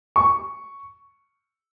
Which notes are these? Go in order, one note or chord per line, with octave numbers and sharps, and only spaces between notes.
C#6